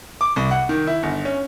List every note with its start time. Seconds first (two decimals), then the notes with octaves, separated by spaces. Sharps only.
0.21 D6
0.36 C2
0.51 F#5
0.69 D#3
0.87 E4
1.03 G1
1.25 C#4